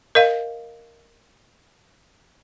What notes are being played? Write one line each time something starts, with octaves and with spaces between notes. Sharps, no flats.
A#4 D#5 F5